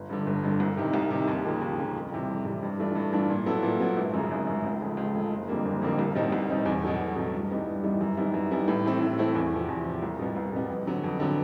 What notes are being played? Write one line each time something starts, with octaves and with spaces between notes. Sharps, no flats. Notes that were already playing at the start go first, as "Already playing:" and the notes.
Already playing: G1
G2 D3
G1
G2 D3
C2
C3 D#3
C2
C3 D#3
D#2
C#3 F3 A#3
D#2
C#3 F3 A#3
F2
C3 E3 G3
F2
C3 E3 G3
G2
E3 A3 D4 F4
G2
E3 A3 D4 F4
A#2
F#3 B3 E4 A4
A#2
F#3 B3 E4 A4
G#1
F#2 C#3
G#1
F#2 C#3
C#2
C#3 F3 A3
C#2
C#3 F3 A3
F#1
F2 D3 G3 A#3
F#1
F2 D3 G3 A#3
C2
B2 G3 C4 D#4
C2
B2 G3 C4 D#4
E2
B2 F#3 A3
E2
B2 F#3 A3
G2
E3 G3 B3 D#4
G2
E3 G3 B3 D#4
F#2
D#3 G3 B3 E4
F#2
D#3 G3 B3 E4
A2
E3 A3 C4 E4
A2
E3 A3 C4 E4
E2
C3 F3
E2
C3 F3
C2
B2 G3 B3
C2
B2 G3 B3
F2
D3 F#3 B3
F2
D3 F#3 B3